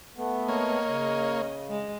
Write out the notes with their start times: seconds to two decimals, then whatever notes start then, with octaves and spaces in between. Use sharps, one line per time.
0.17 A3 B3
0.48 A#3 C#5 D#5
0.87 C#3
1.69 G#3